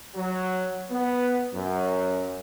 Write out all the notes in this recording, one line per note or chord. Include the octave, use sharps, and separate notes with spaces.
F#3
B3
F#2